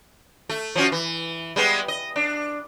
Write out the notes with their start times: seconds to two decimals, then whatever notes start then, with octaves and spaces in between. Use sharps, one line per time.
0.49 A3
0.75 F3 C#4 F#4
0.92 E3
1.56 G3 G#3 B3
1.88 D#5
2.16 D4